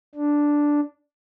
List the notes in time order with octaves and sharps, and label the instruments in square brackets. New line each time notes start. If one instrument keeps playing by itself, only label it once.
[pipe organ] D4